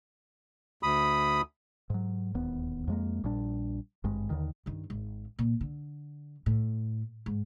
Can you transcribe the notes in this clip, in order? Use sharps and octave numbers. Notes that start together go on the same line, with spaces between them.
D2 B5 D#6
G#2 F#3
D1 D#2 B3
F2 G#3 A#3
A#1 A#2 G3 D4
G#1 G2 G#3
D#2 D3 D#3
G2 D#3
G#1
A#2
D3
A2
G#2